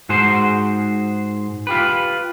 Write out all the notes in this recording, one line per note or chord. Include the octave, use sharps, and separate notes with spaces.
G#2 F#4 G#4 C5
F4 G4 B4